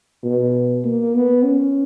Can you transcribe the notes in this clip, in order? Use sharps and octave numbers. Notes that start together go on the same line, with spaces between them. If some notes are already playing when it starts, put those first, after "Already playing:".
B2
A#3
B3
C#4